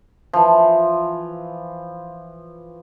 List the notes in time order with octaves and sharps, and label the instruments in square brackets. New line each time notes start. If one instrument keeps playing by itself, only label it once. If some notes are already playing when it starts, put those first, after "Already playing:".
[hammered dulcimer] E3 F3